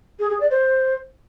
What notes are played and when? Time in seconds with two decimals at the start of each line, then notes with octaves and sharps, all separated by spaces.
0.20 G#4
0.30 G#4
0.40 D5
0.51 C5